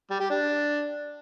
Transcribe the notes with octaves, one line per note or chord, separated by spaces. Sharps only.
G3
G4
D4